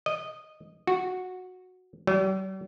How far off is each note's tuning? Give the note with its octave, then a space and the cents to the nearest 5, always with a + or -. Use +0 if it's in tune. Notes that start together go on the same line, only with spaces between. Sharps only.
D#5 -10
F#4 -10
G3 -45